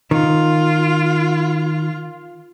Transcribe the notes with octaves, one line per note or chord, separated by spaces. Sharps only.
D#3 F4